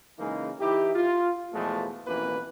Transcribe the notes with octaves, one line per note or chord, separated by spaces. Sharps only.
C#3 E3 G#3 A#3 D#4
E3 D#4 E4 G4
F4
E2 B2 F3 G#3 A3
A1 F2 B2 E3 A#3 B4